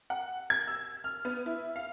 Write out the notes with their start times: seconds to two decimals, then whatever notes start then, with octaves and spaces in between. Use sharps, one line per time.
0.10 F#5
0.50 G#6
0.68 E6
1.04 F6
1.25 B3
1.46 E4
1.76 F5